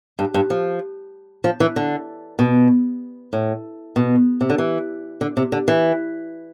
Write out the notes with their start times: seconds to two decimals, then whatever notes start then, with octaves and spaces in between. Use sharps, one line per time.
0.19 G2
0.34 G2
0.50 F3
1.44 F3
1.60 E3
1.76 D3
2.39 B2
3.33 A2
3.96 B2
4.41 C3
4.50 D3
4.58 E3
5.21 D3
5.37 C3
5.52 D3
5.68 E3